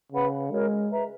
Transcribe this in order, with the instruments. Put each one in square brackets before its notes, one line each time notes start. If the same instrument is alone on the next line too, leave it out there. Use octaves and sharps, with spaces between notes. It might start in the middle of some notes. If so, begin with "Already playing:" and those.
[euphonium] C#3 [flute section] B4 F#5 B5
[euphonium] G#3 [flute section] F#4 A#4 C#5
[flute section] B4 E5 A#5